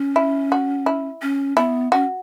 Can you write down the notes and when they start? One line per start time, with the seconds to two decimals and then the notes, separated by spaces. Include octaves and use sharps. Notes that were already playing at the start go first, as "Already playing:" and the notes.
Already playing: C#4
0.16 E4
0.52 F#4
0.86 E4
1.22 C#4
1.57 B3 E4
1.92 C#4 F#4